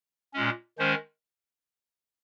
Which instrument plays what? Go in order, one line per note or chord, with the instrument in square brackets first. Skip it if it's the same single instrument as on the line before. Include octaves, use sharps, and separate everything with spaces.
[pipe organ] A#2 G#3 C#4
D#3 G#3 C#4 C5